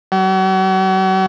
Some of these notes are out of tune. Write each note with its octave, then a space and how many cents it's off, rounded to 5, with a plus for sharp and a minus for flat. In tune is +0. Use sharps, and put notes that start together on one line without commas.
F#3 +40